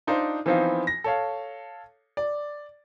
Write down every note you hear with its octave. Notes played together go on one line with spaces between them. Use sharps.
D4 D#4 F4 C5
E3 F3 B3 C4 D#4 F4
A#6
A4 C#5 F5
D5